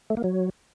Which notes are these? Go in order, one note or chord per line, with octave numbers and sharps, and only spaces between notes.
A3
A#3
F#3